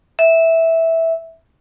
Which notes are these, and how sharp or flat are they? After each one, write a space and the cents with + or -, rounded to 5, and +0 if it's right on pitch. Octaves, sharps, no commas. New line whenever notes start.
E5 -10